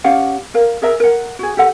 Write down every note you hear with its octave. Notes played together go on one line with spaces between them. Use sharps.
C#4 G4 F5 F#5
A#4 F5
G#4 A#4 E5 A#5
A#4 F#5
F#4 G#4
G4 A4 F#5